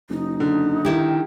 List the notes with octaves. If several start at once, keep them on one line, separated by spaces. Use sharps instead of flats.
F#1 D#4
D3
D#3 E4 G4